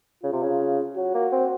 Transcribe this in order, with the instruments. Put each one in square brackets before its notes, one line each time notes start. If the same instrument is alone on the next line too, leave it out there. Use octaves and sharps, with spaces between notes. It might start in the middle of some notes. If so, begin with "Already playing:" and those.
[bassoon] C#3 [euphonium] F4
[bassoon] C3
C#3
[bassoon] F#3 [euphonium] F#4
[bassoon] A#3
C4